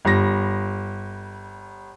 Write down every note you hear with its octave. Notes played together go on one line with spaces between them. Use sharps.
G1 G3 A#6